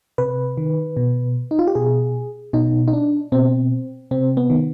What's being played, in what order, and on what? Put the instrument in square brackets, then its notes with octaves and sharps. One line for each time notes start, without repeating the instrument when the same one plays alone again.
[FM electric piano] C3 B4
D#3
B2
D#4
F4
G4
B2 G#4
B2 D#4
D#4
D4
B2 C4
C3 C4
B3
D#3